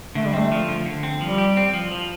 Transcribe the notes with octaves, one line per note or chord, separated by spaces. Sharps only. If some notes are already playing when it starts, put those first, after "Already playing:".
D3 A3
G3
C4
A3
F3
D3
D3
C4
F3 G3
G4
C4
F3
F3